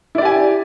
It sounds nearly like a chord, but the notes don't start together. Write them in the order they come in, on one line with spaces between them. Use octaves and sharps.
E4 D5 G4 G#5